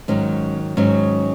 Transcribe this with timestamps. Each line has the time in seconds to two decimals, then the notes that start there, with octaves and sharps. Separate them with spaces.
0.08 G#2 D#3 F#3 C#4
0.77 G#2 D#3 F#3 C#4